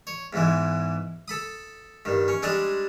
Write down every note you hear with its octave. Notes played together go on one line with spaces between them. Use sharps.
C#5
E2 G#2 E3 G#3
A4 B5 D#6
G2 D#3
C#4
G3 G#3 C4 D4 G#4 D#5